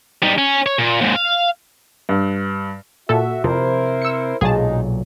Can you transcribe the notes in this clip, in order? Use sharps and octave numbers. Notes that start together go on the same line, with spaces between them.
G3 D#4
C#4
C#5
A#2
D#2 G#2
F5
G2
A#2 F#4 A4 E5
F2 C3 E4 A#4 C5
E6 C#7
B1 A#2 F#3 G#3 D#4 G#4 A5